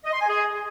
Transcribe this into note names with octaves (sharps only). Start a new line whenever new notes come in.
D#5
C6
G#5
G#4